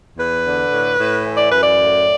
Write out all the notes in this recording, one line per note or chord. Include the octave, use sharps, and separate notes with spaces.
E2 B4
D3
A2
A2
E3
D5
F#2 B4
D5
A2